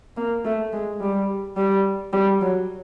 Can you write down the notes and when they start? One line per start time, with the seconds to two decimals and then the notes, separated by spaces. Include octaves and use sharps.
0.17 A#3
0.45 A3
0.73 G#3
1.01 G3
1.57 G3
2.13 G3
2.41 F#3